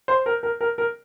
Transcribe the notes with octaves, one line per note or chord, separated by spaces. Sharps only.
C5
A#4
A#4
A#4
A#4